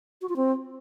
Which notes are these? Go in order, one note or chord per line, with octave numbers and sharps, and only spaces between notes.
F#4
F4
C4